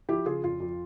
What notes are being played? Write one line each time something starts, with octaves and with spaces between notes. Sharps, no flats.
F3 E4 G4
C#3 F4 G#4
F2 F4
F2